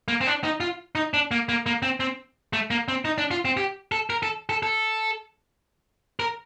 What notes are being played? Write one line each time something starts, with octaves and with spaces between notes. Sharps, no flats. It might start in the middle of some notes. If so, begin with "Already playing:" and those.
A#3
C4
D4
D#4
F4
D#4
D4
A#3
A#3
A#3
C4
C4
A3
A#3
C4
D#4
D4
F4
C4
G4
A4
A#4
A4
A4
A4
A#4